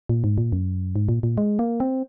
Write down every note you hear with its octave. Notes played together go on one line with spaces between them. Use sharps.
A#2
G#2
A#2
F#2
G#2
A#2
A#2
G#3
A#3
C4